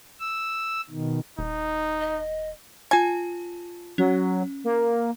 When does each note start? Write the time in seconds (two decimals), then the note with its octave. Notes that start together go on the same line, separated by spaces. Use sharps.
0.20 E6
0.90 B2 D#3
1.39 D#1 D#4
2.01 D#5
2.91 F4 G#5 A5
3.98 F#3 C#4
4.64 A#3